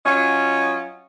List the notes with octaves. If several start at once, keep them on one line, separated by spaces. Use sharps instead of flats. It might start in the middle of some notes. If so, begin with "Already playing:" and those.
F#3 C#4 F4 D#5